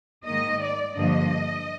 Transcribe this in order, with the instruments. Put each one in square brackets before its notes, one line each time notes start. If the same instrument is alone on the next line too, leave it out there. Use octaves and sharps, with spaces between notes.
[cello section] G#2 D#3 A#3 D#5
D5
G2 D3 F3 A#3 D#5